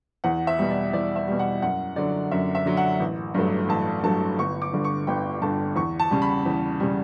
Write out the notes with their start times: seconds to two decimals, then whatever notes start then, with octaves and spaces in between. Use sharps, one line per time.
0.24 E2 F#5
0.47 E5
0.59 B2 G3
0.71 D5
0.93 E2 D5
1.16 E5
1.28 B2 G3
1.39 F#5
1.62 F#2 F#5
1.96 D3 F#3 D5
2.31 F#2 E5
2.55 E5
2.65 D3 F#3
2.77 F#5
3.00 A1
3.34 G2 F#3 A3
3.69 A1 A5
4.03 G2 F#3 A3 A5
4.38 G1 C#6
4.62 D6
4.73 G2 D3
4.84 C#6
5.07 G1 G5
5.42 G2 D3 A5
5.76 E2 C#6
6.00 A5
6.10 C#3 G3
6.22 B5
6.46 E2
6.80 C#3 G3